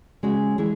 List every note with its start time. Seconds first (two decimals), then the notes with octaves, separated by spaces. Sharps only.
0.23 C#3 G#3 C#4 F#4 B4
0.58 E3 G#3 E4 G#4